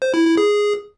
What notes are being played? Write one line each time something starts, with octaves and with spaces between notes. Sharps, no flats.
C5
E4
E4
G#4